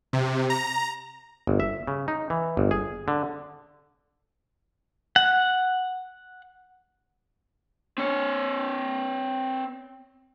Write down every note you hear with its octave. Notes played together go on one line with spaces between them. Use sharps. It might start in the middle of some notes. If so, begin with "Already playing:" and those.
C3
A#5
G1
E5
C#3
D#4
E3
G1
G#4
D3
F#5
C4 C#5